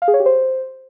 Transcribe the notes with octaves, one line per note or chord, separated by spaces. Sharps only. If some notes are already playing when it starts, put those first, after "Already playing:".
F5
G#4
C#5
G4
C5